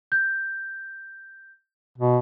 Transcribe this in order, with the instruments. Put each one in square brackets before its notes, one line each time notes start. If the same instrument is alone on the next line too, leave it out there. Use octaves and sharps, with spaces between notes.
[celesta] G6
[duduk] B2